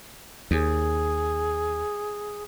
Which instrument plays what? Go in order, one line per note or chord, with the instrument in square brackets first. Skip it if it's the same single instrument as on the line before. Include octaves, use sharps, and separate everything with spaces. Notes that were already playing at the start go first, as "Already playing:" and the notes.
[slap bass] D#2 [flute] G#4